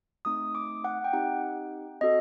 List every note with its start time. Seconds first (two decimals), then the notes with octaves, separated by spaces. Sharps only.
0.25 A3 C4 D#4 D#6
0.55 D6
0.84 F#5
1.04 G5
1.13 C4 D#4 G4 F#5
2.01 C4 F#4 A4 D#5